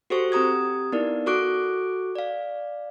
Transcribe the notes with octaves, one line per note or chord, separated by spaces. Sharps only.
F#4 G4 A4 C5 C#6 C#7
C4 G4 A#5 D#6 G#6
B3 D#4 E4 A#4 D5
F#4 A4 C#6 D6 F#6 D7
D5 F5